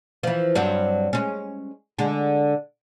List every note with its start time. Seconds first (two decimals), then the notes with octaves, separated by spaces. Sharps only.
0.23 E3 F3
0.55 G2 F#3 C4
1.13 G#3 C#4
1.99 D3 G#3